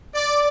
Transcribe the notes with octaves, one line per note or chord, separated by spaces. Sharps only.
D5